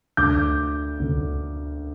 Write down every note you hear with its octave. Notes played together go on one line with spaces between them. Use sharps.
D2 D3 D6 G6
D2 D3